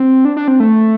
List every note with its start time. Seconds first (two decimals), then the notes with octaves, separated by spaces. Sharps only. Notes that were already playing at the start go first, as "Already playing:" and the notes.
Already playing: C4
0.25 D4
0.37 D4
0.48 C4
0.60 A3